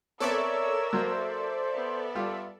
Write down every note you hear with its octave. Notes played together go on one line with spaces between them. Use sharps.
B3 C4 A4 A#4 C#5 D5 E5 E6
F#3 A#3 C5
B3
G3 F4